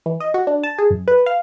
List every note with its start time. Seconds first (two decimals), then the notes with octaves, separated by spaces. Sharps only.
0.06 E3
0.20 D#5
0.34 F#4
0.47 D4
0.64 A5
0.79 G#4
0.90 F#2
1.08 B4
1.26 F5